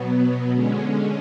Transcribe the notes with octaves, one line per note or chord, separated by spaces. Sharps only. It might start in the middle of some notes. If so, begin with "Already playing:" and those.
Already playing: B2 F#3 B3
D3 G#3 C#4